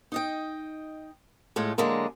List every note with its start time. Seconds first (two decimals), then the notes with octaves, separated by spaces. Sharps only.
0.12 D#4 D#5 G5
1.56 A2 G#3 A3 F4
1.78 D3 F#3 G#3 A#3